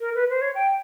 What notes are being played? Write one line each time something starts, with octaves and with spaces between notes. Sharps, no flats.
A#4
B4
C5
C#5
G5